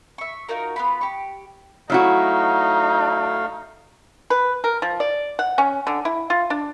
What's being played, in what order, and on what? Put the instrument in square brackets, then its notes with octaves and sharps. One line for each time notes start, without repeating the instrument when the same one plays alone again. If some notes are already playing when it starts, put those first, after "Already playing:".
[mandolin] E5 C#6
D#4 F4 F#4 A#4
B3 F4 B5
G4 C#6
[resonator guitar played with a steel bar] F#3 E4 F#4 [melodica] A3 F5 [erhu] D#4
[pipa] B4
A#4
F3
D5
F#5
C#4
D3
E4
F4
D4